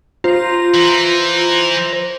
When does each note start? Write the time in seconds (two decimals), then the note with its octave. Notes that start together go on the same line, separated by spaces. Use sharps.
0.24 F4 C5 A#5
0.74 E3